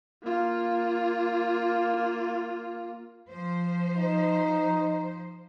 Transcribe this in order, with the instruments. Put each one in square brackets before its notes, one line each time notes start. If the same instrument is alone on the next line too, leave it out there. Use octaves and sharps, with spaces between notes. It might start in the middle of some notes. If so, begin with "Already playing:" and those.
[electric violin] A#3 F4
[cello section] F3 C5
[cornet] D#4